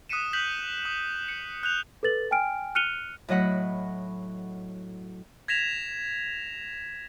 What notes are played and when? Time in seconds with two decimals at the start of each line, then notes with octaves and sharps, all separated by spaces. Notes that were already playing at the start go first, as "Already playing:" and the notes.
0.09 D#6 F#6 B6 C#7 D#7 E7
0.33 F#6 G6 B6 F#7
0.85 D#6
1.12 E7
1.28 C#7
1.63 F#6 G6 F7
2.03 A4 B4 A6 F#7
2.31 G5 G#5 F6 D7
2.75 F6 F#6 C#7 D#7 F7 G7
3.28 A2 F#3 D#5 F#5 B5
5.48 G#6 A#6 B6 E7 F7